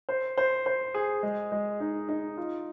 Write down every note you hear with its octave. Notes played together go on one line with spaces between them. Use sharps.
C5
C5
C5
G#4
G#3
G#3
D#4
D#4
F4